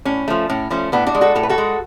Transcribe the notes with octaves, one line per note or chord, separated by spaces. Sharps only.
A2 C#4
F3 A3
A2 C#4
F3 A3 C#4
A2 B3 D4
D4 F#4
G#3
F#4 A4
A2 A4
B4
F#4 A4
G#3